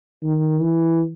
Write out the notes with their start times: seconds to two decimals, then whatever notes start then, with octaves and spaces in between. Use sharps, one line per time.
0.23 D#3
0.61 E3